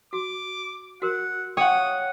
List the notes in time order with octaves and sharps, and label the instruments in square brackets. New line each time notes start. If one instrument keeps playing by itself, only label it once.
[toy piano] F#4 [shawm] D6
[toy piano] F#4 A#4 [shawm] F#5
[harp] C#5 F#5 [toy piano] G5 [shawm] D#6